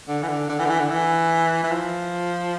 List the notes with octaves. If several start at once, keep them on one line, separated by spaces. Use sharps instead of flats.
D3
E3
D3
D3
E3
D3
E3
D3
E3
E3
F3